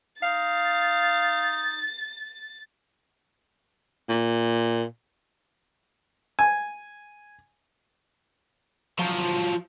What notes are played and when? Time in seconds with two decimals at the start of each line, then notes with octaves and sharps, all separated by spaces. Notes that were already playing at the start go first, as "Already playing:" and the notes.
0.23 D#4 F5 A6
4.09 A#2
6.39 G#5
8.99 F3 F#3